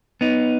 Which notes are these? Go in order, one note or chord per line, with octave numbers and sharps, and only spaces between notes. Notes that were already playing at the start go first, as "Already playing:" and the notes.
B3 D#4